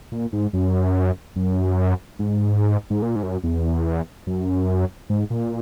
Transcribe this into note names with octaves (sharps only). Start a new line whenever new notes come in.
A#2
G#2
F#2
F#2
G#2
G#2
A#2
G#2
F#2
E2
F#2
G#2
A#2